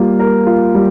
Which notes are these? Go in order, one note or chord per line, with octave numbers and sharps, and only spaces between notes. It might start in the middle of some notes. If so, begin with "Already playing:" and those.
Already playing: G3 A#3 F4
A#4
F4
G3